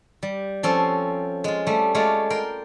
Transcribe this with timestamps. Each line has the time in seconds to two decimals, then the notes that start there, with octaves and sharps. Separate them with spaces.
0.23 G3
0.63 F3 C4 C#4 A4
1.44 G#3 F4
1.67 G3 A3
1.95 G#3 A3 F4 C#5 D5 F5
2.30 A#4 G5 C6